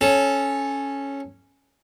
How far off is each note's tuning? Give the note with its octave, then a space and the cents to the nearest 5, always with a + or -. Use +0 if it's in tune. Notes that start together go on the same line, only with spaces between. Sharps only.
C#4 -5 A4 -15